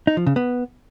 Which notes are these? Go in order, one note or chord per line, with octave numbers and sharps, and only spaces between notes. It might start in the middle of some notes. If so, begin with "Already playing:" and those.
D#4
F3
C#3
B3